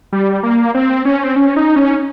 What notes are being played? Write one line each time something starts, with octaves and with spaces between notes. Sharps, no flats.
G3
A#3
C4
C#4
C4
C#4
D#4
C#4